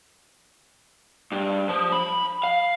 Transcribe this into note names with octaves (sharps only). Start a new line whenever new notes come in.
G2
F3
B5
F5